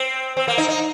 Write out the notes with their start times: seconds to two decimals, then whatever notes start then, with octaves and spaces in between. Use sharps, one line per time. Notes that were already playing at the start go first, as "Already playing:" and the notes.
Already playing: C4
0.37 C4
0.48 A#3
0.58 D#4
0.69 D#4